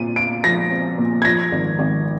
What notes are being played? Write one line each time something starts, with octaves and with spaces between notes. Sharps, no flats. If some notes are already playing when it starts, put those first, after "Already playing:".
Already playing: A#2 C4 D#7
F4 D7
F3 A#6
C4
A#2
G#6
F3 A#6
G#1
G#1